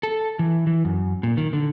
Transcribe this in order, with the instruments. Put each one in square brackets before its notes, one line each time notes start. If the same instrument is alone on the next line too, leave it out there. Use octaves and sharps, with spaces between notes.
[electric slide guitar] A4
E3
E3
F#2
A#2
D#3
D3